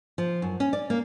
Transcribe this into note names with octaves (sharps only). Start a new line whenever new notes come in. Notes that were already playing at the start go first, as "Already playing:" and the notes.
F3
F#2
C#4
D5
A#3